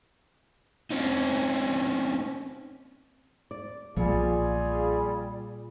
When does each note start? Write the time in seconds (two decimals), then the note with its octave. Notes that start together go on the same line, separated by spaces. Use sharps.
0.91 C4 C#4 D#4
3.51 D5
3.96 B1 A#2 F3 G3 F4 G#4